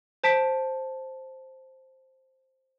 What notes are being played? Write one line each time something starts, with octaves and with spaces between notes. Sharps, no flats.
C5 A5 B6 D7